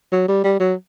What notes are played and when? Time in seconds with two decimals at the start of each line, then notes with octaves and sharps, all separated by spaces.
0.12 F#3
0.28 G3
0.44 G3
0.60 F#3